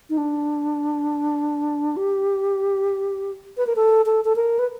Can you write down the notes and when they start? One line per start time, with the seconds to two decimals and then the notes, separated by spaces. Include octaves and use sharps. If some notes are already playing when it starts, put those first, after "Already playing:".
0.10 D#4
0.18 D4
1.97 G4
3.57 B4
3.67 A#4
3.76 A4
4.06 A4
4.25 A4
4.36 A#4
4.59 B4